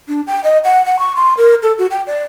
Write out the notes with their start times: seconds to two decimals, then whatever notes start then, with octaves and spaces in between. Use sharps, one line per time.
0.08 D4
0.27 G5
0.44 D#5
0.64 F#5
0.86 F#5
0.99 C#6
1.16 C6
1.37 A#4
1.63 A4
1.78 F#4
1.91 G5
2.07 D5